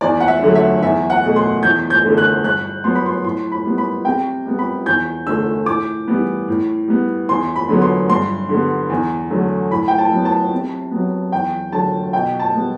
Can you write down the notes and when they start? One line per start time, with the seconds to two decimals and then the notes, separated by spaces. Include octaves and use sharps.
0.01 E2 D5
0.20 F#5
0.28 E5
0.42 D3 F#3 A3
0.55 E5
0.82 E2 E5
1.10 F#5
1.23 B2 A3
1.36 C6
1.63 E2 G6
1.90 G6
2.04 D3 A3
2.18 F#6
2.43 G2 F#6
2.84 F#3 B3 C6
2.95 B5
3.06 C6
3.24 A2 C6
3.52 B5
3.65 G3 B3
3.78 B5
4.05 C3 G5
4.46 G3 B3
4.59 B5
4.86 E2 G6
5.27 D3 A3 E6
5.66 A2 D6
6.07 E3 G3 B3
6.48 A2
6.88 G3 B3
7.29 E2 C6
7.56 B5
7.68 D3 F#3 B3
7.82 C6
8.09 G2 C6
8.49 D3 G3 B3
8.90 E2
9.30 D3 F#3 A3
9.71 A2 B5
9.88 G5
9.98 A5
10.11 F#3 B3
10.25 A5
10.52 C3
10.91 F#3 B3
11.32 E2 G5
11.72 D3 F#3 A5
12.13 B2 G5
12.39 A5
12.54 G3 B3